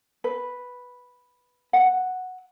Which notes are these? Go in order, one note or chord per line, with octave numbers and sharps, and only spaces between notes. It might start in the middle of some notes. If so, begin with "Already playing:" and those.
B4
F#5